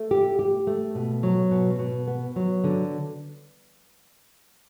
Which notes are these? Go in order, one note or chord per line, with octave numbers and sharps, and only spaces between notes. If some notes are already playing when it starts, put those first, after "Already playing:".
Already playing: A3
G4
G4
A3
B2
F#3
B2
B2
B3
F#3
D3